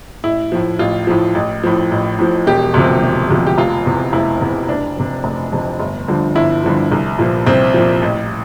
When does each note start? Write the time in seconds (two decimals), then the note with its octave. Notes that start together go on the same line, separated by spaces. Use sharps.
0.24 A1 E4
0.52 A2 F3
0.79 A1 F4
1.07 A2 F3
1.35 A1
1.64 A2 F3
1.91 A1
2.19 A2 F3
2.47 E1 G4
2.74 D2 C3 F3
3.02 E1
3.30 D2 C3 F3
3.47 G4
3.58 F1 F4
3.86 E2 C3
4.13 F1 E4
4.41 E2 C3
4.69 F1 D4
4.97 F2 C3
5.24 F1
5.52 F2 C3
5.79 G1
6.08 G2 D3 F3
6.35 G1 E4
6.64 G2 D3 F3
6.92 C2
7.19 A#2 F3
7.46 C2 C4
7.74 A#2 F3
8.02 A1